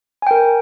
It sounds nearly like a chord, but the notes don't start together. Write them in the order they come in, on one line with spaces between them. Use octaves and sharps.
G#5 G5 A#4